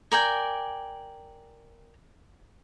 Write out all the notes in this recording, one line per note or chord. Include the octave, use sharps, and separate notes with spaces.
A#4 D5 G5 G#5